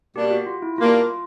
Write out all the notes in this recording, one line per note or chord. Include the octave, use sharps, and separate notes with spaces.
B2 G3 A#3 D4 G4
F#4
F4
E4
B2 G3 A#3 D4 F4